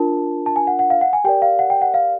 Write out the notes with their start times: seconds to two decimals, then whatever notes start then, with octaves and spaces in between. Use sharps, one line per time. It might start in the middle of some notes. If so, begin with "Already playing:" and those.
Already playing: D4 F4 A#4 A5
0.46 A5
0.56 G#5
0.67 F#5
0.79 F#5
0.90 F5
1.01 F#5
1.13 G#5
1.24 G4 A#4 D5 G5
1.42 F5
1.59 F#5
1.70 G5
1.82 F#5
1.94 F5